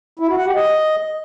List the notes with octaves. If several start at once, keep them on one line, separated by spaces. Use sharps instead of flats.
E4
F#4
F#5
G4
D#5